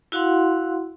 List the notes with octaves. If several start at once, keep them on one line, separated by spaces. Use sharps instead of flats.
E4 F#4 F5 F#5 C6